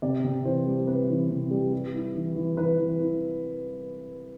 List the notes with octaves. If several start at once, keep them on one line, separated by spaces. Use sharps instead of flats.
C3 D5
C3
E3 C5
G3
C3 B4
E3
C3
G3
G3
E4
E3
E3
E3 B4
E3
E4